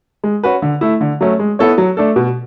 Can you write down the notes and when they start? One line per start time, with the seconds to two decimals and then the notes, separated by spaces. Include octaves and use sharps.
0.24 G#3
0.43 C#4 F#4 B4
0.62 D3
0.81 A3 E4
1.01 D3
1.21 F#3 A3 C#4
1.39 G#3
1.59 B3 E4 A4 C#5
1.78 F#3
1.97 A3 D4 A4
2.16 B2